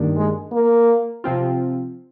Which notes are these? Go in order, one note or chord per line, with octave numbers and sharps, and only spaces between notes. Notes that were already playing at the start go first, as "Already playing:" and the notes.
Already playing: G2 D#3 G3 A#3 D4
G#3
A#3
C3 F3 C4 F4